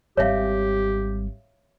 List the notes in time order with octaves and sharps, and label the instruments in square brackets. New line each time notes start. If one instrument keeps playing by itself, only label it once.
[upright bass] G#1 G3 [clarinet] G4 [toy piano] C#5 E5 F5